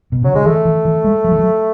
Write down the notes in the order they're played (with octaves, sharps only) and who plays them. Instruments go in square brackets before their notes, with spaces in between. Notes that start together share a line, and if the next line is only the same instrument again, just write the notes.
[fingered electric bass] B2
[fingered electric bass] C#3 [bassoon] F#3
[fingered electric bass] D3 [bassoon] G#3
[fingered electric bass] E3 [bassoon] A3
[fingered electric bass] E3
E3
G#3
F#3
E3
F#3